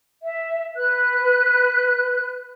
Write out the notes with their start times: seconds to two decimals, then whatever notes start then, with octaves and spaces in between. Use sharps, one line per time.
0.22 E5
0.75 B4 F#6